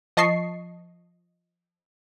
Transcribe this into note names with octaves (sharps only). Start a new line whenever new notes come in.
F3 D#5 A5 C#6 C7